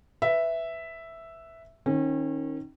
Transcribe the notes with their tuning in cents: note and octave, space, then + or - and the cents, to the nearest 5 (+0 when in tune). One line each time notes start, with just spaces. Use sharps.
B4 +5 E5 +0
D#3 +0 C#4 -35